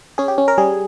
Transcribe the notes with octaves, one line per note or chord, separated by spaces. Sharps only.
C#4 G#4
G4
C#4
A#4
G3 G#4